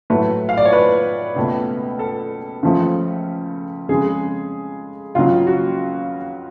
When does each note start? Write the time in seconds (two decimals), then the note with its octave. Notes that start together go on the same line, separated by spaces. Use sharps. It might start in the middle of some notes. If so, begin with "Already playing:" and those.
0.10 A2 F#3 A3 B4
0.49 F5
0.57 D5
0.65 C#5
0.73 B4
1.36 C#2 B2 A3
1.99 A4
2.63 C#2 C#3 F3 A3
3.89 F2 C#3 G#3 G#4
5.15 C#2 C#3 F#3 F4
5.47 F#4